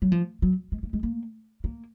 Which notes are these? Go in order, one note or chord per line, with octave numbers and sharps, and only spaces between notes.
F#3
F3
F#3
G#3
A#3
G#3
A#3
A#3